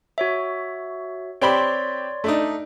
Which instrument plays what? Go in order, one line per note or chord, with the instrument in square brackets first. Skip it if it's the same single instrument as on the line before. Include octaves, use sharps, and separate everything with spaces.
[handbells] F#4 C#5 E5
[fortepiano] C4 G4 B5 [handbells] C#5 D5 C6
[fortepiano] A3 D4 D#4